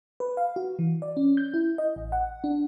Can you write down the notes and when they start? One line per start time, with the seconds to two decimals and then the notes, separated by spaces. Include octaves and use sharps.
0.20 B4
0.37 F5
0.56 F#4
0.79 E3
1.02 D5
1.17 C#4
1.37 G6
1.54 E4
1.78 D#5
1.96 A1
2.12 F#5
2.44 D4